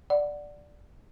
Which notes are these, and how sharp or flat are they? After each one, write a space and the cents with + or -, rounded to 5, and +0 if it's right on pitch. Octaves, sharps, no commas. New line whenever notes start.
D5 +0 F#5 +0